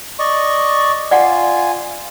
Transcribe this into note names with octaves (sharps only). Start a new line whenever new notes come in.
D5 D#5 C#6
F4 D5 F#5 G#5